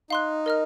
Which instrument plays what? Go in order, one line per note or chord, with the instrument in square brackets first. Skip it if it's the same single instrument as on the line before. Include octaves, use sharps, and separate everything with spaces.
[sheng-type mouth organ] D#4 [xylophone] F5 C6 F#6
[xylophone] A#4 D#5 A#5 F6